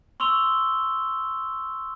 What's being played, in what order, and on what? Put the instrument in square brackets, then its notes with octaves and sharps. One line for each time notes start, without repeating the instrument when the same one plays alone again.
[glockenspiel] C6 C#6 E6 F7 G7